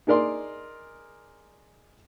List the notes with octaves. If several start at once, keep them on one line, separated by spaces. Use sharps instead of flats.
D#4 G#4 A#4 D5 C6